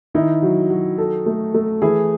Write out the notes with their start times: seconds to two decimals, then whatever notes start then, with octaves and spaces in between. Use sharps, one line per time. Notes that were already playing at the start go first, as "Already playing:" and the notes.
0.14 D#3 D#4 E4
0.42 F#3
0.70 F#3
0.98 A4
1.26 A3
1.54 A3
1.82 E3 E4 G#4